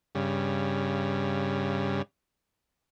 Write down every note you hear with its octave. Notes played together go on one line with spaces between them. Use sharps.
G2 C#3